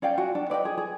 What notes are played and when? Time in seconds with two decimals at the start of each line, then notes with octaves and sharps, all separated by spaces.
0.02 C#4 D5 F5 G5
0.18 F#4 G#5
0.35 D4
0.50 B4 D5 D#5 G5
0.65 G#4
0.78 G#4